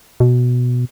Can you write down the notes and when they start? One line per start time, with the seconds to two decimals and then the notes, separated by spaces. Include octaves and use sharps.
0.20 B2